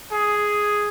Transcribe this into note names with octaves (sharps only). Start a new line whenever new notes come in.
G#4